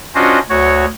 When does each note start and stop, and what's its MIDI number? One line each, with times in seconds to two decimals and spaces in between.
0.15 0.39 61
0.15 0.39 62
0.15 0.39 65
0.15 0.39 66
0.15 0.39 72
0.15 0.39 75
0.50 0.85 38
0.50 0.85 66
0.50 0.85 73